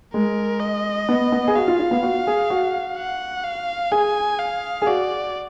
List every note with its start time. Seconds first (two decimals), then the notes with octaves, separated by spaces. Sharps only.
0.14 G#3 A#4
0.61 D#5
1.09 B3
1.32 B3
1.48 G#4
1.56 F#4 F5
1.68 F4
1.80 F4
1.91 B3
2.03 F#4
2.27 G#4
2.50 F#4
2.97 F#5
3.44 F5
3.92 G#4 G#5
4.39 F5
4.82 G#4
4.87 F#4 D5